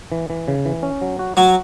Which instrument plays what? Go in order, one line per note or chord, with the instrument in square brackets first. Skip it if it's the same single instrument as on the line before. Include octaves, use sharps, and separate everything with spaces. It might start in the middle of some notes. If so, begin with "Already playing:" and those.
[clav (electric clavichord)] E3
E3
C#3
E3
C#4
F#3
F#4
[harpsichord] F#3 [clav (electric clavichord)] F#4